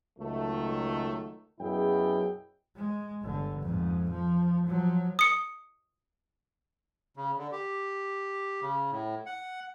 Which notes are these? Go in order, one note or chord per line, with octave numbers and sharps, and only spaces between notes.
C#2 D#3 F#3 A3
F#2 B2 E4 G#4 G5
G#3
G1 D3
F2 G#2
F3
F3 F#3
D#6 C#7
C#3
D3
G4
C#3
A2
F#5